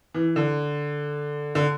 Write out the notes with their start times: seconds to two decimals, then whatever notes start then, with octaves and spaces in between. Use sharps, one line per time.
0.14 E3
0.36 D3
1.55 D3